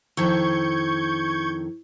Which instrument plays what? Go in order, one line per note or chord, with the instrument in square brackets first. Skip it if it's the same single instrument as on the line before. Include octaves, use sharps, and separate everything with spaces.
[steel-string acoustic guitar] F2 D#3 [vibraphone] E4 [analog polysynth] C#6 G6 G#6